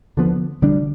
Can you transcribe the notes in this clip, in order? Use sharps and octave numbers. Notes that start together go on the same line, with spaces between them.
D#2 D3 F3 B3
D2 D3 G3 D4